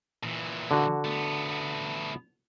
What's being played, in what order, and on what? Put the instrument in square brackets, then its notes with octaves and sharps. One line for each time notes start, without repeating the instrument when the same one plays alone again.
[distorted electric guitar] A#2 E3
[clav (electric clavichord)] D3 F#4
[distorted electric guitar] A3 B3